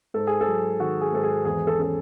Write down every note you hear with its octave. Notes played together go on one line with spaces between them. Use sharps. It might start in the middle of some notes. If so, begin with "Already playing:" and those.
G#2 A4
G#4
A4
F#3
D#3 F#4
G#4
G#2 A4
G#4
E2 G#4
A4
C#4 A4